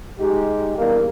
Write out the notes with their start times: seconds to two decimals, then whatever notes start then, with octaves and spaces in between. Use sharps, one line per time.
0.19 G#3 D#4 G4
0.78 E2 G2 A#3